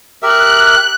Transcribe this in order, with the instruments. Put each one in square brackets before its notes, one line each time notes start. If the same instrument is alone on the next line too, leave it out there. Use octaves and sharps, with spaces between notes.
[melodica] G4 A#4 E5 [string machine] F#6